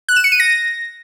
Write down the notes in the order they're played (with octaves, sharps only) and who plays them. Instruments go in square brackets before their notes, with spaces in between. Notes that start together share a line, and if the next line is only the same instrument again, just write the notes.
[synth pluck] F#6
E7
C#7
D#7
A#6